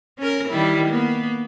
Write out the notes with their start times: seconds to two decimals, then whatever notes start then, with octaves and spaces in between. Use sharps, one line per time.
0.18 C#4 A#4
0.48 D#3 G3 E4
0.90 A#3 B3